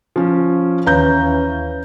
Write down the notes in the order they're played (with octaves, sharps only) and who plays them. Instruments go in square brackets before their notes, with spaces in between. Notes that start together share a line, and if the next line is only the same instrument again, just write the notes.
[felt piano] F3 C#4
[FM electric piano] D#2 B4 F5 [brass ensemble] E3 C#4 [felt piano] A#5 G6